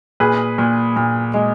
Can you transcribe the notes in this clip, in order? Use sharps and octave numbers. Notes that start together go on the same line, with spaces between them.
A#2 G#4 B4
A#2
A#2
G#3